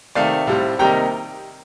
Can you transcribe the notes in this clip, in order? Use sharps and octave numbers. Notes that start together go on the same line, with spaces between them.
C3 D#3 A3 D5 F5
A2 G3 C4
C3 D#3 G3 A#3 D#4 G5 A#5